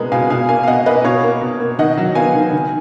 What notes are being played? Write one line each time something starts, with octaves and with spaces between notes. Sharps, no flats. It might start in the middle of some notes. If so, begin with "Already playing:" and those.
Already playing: B2 G#3 B3 G#4 A#4
B2 F5 G#5
B2 F5 G#5
A#3 F5 G#5
F5
B2 D#5 F#5
A#3 B4 D#5
B2 C#5 F5
A#3
B2
A#3
D#3 D#5 F#5
F#3
B3 F5 G#5
D#3
D#3